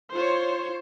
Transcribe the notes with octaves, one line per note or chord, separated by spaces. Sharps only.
F4 C5 C#5